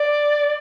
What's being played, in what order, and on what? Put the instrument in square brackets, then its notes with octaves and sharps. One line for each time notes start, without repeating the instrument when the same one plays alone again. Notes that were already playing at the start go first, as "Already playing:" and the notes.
Already playing: [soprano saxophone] D5